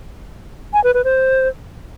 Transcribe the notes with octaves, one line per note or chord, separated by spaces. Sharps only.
G#5
B4
B4
C5